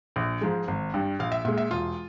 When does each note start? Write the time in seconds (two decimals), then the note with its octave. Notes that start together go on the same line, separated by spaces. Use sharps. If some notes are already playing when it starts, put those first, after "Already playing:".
0.16 A#1
0.41 G#2 F3 G#3
0.68 G#1
0.94 G2 G3
1.19 A#1 F5
1.32 E5
1.45 A#2 G#3 E5
1.58 E5
1.71 E1 F4